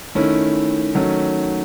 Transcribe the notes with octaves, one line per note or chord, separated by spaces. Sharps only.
D#3 A3 C#4 E4
D#3 F#3 A3 C#4